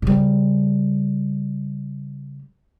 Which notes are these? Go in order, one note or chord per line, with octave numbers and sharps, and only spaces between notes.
C#3 G3